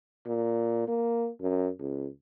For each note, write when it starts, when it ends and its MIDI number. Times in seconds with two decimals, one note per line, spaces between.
0.27 0.87 46
0.88 1.29 58
1.41 1.69 42
1.79 2.07 37